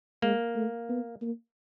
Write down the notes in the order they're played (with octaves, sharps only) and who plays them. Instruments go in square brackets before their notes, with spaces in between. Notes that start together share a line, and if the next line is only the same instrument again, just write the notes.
[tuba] G#3 [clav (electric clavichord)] A#3
[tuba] A3
B3
A#3